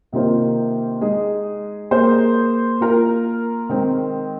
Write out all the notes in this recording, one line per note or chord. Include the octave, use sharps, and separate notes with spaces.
C3 D#3 A#3 F4 C5
G#3 D#4 G#4
A#3 G#4 C5
A#3 F4 A#4
D#3 G#3 C4